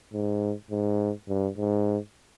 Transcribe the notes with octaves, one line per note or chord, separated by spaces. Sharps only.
G#2
G#2
G2
G#2